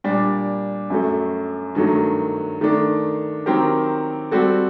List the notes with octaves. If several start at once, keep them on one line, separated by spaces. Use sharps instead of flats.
A#2 G3 D4
F#2 F#3 A3
G2 D#3 F#3 A3
D#3 A3 D4
D#3 F#3 C4 G4 A#4
G3 C4 F#4 A4